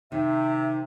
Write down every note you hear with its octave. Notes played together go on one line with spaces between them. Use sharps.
C3 D#3 E5